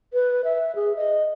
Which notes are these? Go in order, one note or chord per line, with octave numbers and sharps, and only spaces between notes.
B4
E5
G#4
D#5